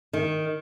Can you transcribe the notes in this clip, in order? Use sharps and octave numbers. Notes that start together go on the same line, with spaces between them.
D#3